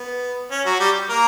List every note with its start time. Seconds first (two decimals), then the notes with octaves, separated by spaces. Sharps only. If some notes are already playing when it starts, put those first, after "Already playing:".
Already playing: B3
0.51 C#4
0.66 F#3 F#4
0.80 G3 G4
1.10 A#3 A#4